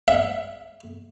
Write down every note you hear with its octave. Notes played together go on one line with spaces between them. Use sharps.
E5